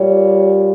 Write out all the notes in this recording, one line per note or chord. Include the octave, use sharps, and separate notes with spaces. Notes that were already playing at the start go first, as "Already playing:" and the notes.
Already playing: A#2 G3 C#5